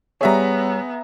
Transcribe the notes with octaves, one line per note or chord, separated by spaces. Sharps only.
G3 B3 G#4 C#5 E5 A#5